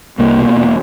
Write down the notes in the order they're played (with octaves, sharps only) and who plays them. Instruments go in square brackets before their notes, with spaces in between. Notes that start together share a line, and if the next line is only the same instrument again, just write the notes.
[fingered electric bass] C2 A#3
B2
E1